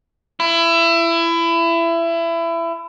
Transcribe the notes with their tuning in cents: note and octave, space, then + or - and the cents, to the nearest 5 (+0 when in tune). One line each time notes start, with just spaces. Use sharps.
E4 +25